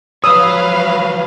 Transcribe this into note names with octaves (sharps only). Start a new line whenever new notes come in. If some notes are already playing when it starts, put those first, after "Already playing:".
F3 F#3 B4 C#5 F5 D#6 E6